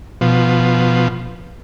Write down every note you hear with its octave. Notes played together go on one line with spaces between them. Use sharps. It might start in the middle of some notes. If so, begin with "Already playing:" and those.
B2 F3